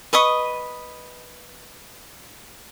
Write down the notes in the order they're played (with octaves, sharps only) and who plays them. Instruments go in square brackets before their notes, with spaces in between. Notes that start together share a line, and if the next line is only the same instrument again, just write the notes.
[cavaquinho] B4 D#5 C#6 D#6